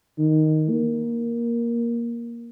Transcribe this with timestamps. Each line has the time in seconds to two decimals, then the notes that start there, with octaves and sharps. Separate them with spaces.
0.19 D#3
0.70 A#3